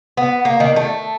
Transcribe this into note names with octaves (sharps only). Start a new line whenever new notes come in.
B3
A#3
D#3
A3